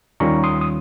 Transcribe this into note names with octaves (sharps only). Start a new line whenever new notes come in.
D#2 D#3 G3 C#4 F4 A#5 C#6
C6 D#6
D#6